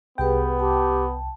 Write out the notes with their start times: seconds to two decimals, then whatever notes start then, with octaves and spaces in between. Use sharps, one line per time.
0.18 C2 B3 G4 G#4 B4 G5
0.59 G4 A5